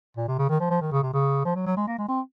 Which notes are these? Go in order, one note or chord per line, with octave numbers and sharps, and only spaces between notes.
A#2
C3
C#3
D#3
F3
F3
D#3
C#3
C3
C#3
F3
F#3
F#3
G#3
A#3
G#3
C4